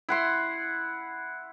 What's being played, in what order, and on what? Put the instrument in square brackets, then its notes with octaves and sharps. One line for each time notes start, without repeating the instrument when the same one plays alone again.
[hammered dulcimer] E4 F#5 C6